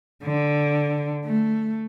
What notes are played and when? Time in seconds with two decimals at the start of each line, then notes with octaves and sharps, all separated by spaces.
0.24 D3
1.26 A3